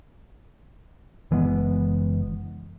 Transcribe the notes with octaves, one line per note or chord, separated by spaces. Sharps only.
F#1 E3 G#3 B3